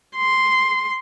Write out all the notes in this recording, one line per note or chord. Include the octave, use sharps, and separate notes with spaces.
C6